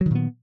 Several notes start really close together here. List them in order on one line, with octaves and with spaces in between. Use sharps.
F#3 D#3 A#2 B3